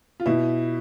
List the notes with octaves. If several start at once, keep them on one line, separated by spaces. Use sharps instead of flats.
F4
B2 E4